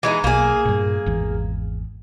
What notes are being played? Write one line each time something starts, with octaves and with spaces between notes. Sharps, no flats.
E3 G#3 D#4
B1 A#3 G#4
G2 A#2
G#1 E2